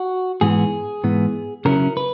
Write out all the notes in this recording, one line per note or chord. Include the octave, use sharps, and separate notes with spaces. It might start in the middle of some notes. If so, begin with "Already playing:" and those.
Already playing: F#4
G#2 E3 B3 G#4
G#2 E3 B3
C#3 F#3 C#4 E4 A#4
B4